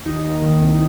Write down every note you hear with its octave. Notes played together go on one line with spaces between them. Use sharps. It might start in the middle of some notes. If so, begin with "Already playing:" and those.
D#2 D#4
D#2
D#3
C2